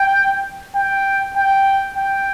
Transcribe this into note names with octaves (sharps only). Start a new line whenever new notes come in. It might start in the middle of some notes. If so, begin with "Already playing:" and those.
Already playing: G5
G5
G5
G5